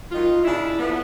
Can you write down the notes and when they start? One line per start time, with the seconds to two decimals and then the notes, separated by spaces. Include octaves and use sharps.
0.11 D#3 F#3 D#4 F4
0.41 D#4
0.45 C#3 D4 E4
0.79 F3 A3 B3